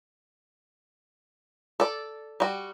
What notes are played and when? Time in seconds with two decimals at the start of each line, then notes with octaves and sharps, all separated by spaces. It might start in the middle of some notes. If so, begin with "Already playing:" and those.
1.80 A4 D5
2.40 G3 F#4